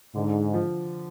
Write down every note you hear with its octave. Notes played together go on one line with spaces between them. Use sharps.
G#2 D3
F3